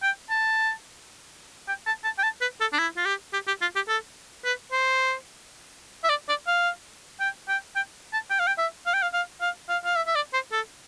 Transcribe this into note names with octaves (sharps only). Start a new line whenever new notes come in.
G5
A5
G5
A5
A5
G5
A5
B4
A4
D4
E4
F4
G4
G4
G4
F4
G4
A4
B4
C5
E5
D5
D5
F5
G5
G5
G5
A5
G5
F5
G5
E5
F5
G5
F5
F5
F5
F5
F5
E5
E5
D5
C5
A4